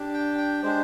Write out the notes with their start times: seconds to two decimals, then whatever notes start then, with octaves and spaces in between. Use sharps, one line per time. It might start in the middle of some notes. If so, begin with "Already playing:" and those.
Already playing: D4 G4
0.14 G5
0.38 G5
0.63 G#3 D4 G4 C5